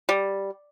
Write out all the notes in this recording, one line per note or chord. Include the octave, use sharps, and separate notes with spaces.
G3